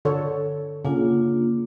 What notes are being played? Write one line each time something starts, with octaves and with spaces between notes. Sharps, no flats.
D3 A4 C#5
C#3 A#3 D4 F4